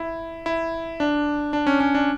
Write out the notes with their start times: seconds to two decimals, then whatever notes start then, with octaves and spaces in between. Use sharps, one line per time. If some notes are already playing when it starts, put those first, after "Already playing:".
Already playing: E4
0.46 E4
1.00 D4
1.53 D4
1.67 C#4
1.80 C#4
1.95 D4